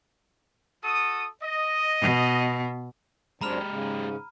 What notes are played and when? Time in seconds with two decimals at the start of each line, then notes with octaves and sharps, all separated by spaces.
0.84 F#4 A4 D#6
1.42 D#5
2.01 B2
3.41 F#2 G#3 C4 D4 G4 A#5 B5 F6
3.69 G#2 C#3